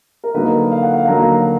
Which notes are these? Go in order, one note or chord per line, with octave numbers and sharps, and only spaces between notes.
A#4
D3 F#3 A#3 D#4 B4
F5
F#5
F5
D3 F#3 A#3 D#4 A#5